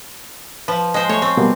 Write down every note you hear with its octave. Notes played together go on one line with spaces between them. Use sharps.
F3 B4
G#3 C5
A3 C#5
C4 C#6
B2 G3 A#3